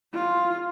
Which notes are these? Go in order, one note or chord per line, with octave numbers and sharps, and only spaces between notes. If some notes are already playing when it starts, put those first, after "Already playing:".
F4